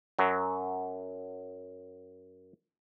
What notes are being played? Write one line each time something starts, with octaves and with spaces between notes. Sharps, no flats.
F#2 F#3